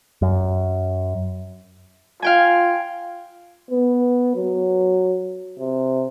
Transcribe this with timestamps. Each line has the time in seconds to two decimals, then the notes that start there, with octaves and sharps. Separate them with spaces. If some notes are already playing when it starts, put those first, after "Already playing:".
0.22 F#2
2.22 F4 F5 G5 G#5
3.71 B3
4.36 F#3
5.59 C3